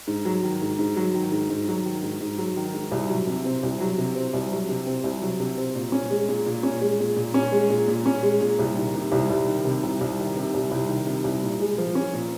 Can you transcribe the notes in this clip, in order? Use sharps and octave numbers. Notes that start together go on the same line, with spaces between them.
G#2
F#3
D#3
G#2
G#2
F#3
D#3
G#2
G#2
F#3
D#3
G#2
G#2
F#3
D#3
G#2
C2
F#3
C3
C4
C2
F#3
C3
C4
C2
F#3
C3
C4
C2
F#3
C3
C4
A#2
C#4
G#3
A#2
A#2
C#4
G#3
A#2
A#2
C#4
G#3
A#2
A#2
C#4
G#3
A#2
C2
D#3
C3
C2
C2
D#3
C3
C2
C2
D#3
C3
C2
C2
D#3
C3
C2
A#2
G#3
F3
C#4
A#2